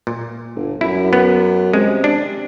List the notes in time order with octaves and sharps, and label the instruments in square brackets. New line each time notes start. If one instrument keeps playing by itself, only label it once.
[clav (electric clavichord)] A#2
[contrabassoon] G1
[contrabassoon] F#2 [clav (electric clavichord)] E4
[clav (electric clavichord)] B3
[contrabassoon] C3 [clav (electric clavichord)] G#3
[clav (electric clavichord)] D4